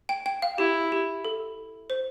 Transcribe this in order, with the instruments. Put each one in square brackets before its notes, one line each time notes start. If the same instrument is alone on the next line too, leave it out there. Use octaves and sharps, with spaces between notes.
[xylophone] G5
G5
F5
[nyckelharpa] E4 [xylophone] G4
[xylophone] G4
A4
C5